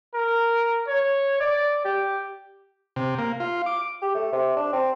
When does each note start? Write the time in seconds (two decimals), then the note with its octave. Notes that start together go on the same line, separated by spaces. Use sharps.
0.14 A#4
0.88 C#5
1.41 D5
1.85 G4
2.96 C3
3.18 A#3
3.40 F4
3.66 D6
4.02 G4
4.15 A3
4.33 C3
4.56 D4
4.73 C4